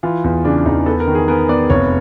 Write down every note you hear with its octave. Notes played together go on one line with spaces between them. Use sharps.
E3 F4
E2
C#3 D4
E2 D#4
B3 A4
A#4
D#3
G#4
B3 A#4
B3 D5
F1 C#5